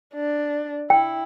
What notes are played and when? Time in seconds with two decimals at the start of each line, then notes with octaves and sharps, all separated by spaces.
0.15 D4
0.90 E4 G5